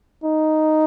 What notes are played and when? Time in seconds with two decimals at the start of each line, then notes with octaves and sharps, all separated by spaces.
0.24 D#4